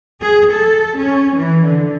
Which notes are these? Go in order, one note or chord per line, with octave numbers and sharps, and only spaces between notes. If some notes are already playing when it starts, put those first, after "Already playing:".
G#4
A4
C#4
E3
D3